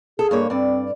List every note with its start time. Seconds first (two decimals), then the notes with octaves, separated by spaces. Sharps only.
0.19 G#4 A4
0.31 G2 A#3 C#5
0.50 G2 C4 D5